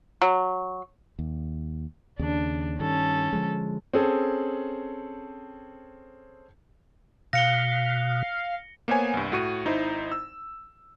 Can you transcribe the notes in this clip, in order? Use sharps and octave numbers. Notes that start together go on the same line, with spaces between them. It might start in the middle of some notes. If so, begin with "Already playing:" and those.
F#3
D#2
D#2 C#3 D4
G2 D#3 C#4 A4
D3 F3 G#3
C4 C#4 G#4 A4
B2 F5 A#6 C#7 G7
A#3 B3 C5 C#5 G#5
C2 G2
A2 F#4 C#6 D#7
G#1 D#4 E4 C5
E6